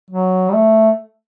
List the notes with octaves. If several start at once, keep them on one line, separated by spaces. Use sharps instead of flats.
F#3
G3
A3